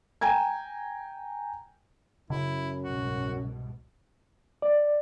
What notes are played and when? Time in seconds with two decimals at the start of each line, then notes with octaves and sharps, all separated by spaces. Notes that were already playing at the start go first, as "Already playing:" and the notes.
0.21 G5 G#5 A#5 G#6
2.30 F#2 C#3 E4
2.83 C2 G#2 B2 F#4
4.62 D5